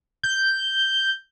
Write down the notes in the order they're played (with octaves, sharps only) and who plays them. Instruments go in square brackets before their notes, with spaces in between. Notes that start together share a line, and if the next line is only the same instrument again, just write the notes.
[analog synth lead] G6